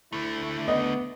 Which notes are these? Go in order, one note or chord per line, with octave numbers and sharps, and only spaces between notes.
D3 A3 E4
B3 D#5